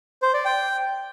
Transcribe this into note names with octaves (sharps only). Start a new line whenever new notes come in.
C5
D5
G5